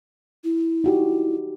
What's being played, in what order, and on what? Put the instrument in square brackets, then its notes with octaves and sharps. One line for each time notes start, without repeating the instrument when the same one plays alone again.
[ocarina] E4
[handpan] D#4 F#4 G4